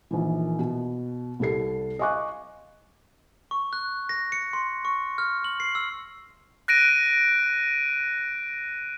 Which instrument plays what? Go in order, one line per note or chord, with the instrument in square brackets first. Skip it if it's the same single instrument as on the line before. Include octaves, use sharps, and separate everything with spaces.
[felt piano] A#1 D#3 E3
B2
C2 G3 A4 C7
D#5 F5 G#5 C#6 D6 F#6
[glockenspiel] C#6
F#6
A#6
C#7
C6
C#6
F6
F#7
C7
E6
[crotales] F#6 A#6 D7 D#7